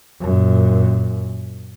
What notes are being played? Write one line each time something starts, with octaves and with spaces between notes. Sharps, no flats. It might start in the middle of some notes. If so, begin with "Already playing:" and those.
F#2 A#2